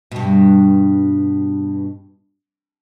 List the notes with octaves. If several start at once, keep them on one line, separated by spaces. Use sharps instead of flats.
G2 B2